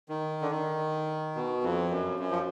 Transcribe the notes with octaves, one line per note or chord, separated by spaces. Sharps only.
D#3
D3
D#3
B2
F2
F#2
F#2
F3